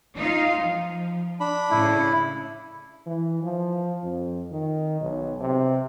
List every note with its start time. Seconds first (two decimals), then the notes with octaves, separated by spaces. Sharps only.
0.17 D#4 F4 F5
0.62 F3
1.40 D4 B5
1.71 A2 C#3 E4
3.07 E3
3.43 F3
4.03 F2
4.51 D#3
5.01 B1
5.40 C3